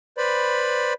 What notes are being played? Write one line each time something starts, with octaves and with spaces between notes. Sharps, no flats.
B4 C5 D5 B5